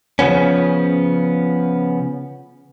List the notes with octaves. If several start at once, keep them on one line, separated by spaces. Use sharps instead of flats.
C#3 F3 B3 C#4